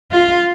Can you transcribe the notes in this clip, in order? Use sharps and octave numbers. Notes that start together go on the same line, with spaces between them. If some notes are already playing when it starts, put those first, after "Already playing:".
F4